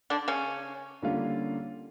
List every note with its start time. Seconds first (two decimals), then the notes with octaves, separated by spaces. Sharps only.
0.10 D3 D4
0.28 C#3 C#4
1.02 D3 G3 A#3 C#4 F4